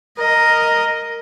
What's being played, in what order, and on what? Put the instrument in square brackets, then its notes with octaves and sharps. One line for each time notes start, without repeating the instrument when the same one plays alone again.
[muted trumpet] A#4 [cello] D#5